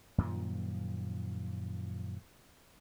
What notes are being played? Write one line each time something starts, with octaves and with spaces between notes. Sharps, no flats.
F#2 A#2 D#3 F3